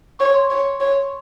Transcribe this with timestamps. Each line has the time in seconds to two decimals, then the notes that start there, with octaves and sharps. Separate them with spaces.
0.19 C#5 C#6
0.34 C6
0.50 C#5
0.80 C#5